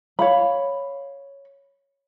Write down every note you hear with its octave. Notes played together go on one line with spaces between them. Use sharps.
C#5 F5 B5